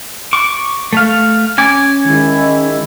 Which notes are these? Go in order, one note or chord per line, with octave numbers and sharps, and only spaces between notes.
C#6 D6
A3 F5
C#4 G#5 D6
D#3 G#3 E4